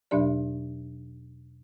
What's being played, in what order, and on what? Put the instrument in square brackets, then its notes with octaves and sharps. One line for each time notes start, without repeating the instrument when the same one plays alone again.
[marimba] E2 B2 F#3 D4 G4 D5